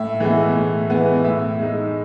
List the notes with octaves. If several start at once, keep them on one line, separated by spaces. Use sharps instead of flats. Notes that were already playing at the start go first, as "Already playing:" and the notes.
Already playing: A2 E5
E3 G#3 B3
A2
E3 G#3 B3
A2 E5
G#3 D#4